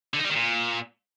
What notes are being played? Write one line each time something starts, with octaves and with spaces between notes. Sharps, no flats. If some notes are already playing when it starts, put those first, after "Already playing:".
D3
D#4
G3
D#3
A#2